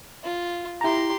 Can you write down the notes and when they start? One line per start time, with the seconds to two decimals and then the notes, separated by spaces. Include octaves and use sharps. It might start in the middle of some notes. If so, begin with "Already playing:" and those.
0.24 F4
0.81 E4 G4 A#5 C6